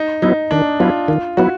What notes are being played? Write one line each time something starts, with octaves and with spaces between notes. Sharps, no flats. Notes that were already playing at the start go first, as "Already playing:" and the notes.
Already playing: D#4
F#3 B3 D#4 E4
D#3 D4
F#3 B3 E4 F4
D#3 F4
F#3 B3 E4 F#4